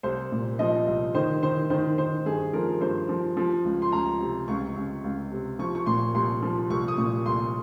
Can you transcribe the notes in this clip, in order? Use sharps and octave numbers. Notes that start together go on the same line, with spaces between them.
C2 C5
A#2
F3 D#5
C2
D#3 C5
D#3 C5
D#3 C5
D#3 C5
G2 G#4
F3 A#4
G2 C5
F3
F3
C#2
C6
C#2 A#5
C3
C#2 C#6
C#2
C#2
C3
F3 C#6
C#6
A#2 C6
C2 C6
F3
C2 C#6
D#6
A#2 C#6
C2 C6